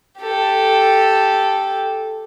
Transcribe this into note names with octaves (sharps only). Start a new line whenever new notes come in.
G4 A4